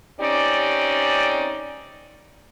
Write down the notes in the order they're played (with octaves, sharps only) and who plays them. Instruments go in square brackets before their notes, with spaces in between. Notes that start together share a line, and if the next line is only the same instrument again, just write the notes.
[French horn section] C4 C#4 D#4 G4 D5